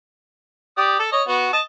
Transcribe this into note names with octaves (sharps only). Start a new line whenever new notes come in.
G4 D5 D#6
A4
C#5 D#5
B3 F#4
D#5 A5